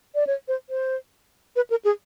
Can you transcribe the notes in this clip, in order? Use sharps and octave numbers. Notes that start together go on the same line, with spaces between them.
D5
C#5
C5
C5
B4
A#4
G#4